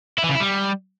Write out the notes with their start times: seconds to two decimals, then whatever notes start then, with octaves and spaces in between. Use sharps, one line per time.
0.18 E4
0.24 E3
0.29 C#3
0.35 E4
0.40 G3